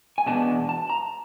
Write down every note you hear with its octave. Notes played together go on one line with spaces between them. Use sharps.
G#5
E2 B2 G#3 B3 D4 A5
A5
A#5